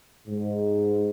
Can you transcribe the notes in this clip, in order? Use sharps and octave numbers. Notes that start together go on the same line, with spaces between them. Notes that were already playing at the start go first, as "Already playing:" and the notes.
G#2